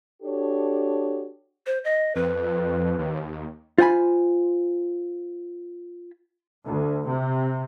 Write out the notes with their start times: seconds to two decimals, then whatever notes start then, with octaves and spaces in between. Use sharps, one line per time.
0.23 D4 F#4 G4 A4 C#5
1.66 C5
1.84 D#5
2.16 F2 B4
2.98 D#2
3.78 F4 C5 F#5 G#5 B5
6.66 D2
7.08 C3